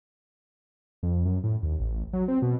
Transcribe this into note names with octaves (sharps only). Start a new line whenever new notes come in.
F2
F#2
A2
D#2
A1
F#3
C4
B2